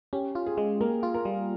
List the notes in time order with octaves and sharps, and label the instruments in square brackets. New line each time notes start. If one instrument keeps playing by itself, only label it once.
[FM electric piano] C#4 [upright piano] G4
[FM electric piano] F4
[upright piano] G#4
[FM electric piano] G#3
[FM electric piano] A#3 [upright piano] A#4
[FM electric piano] F4
[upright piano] A#4
[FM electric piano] G3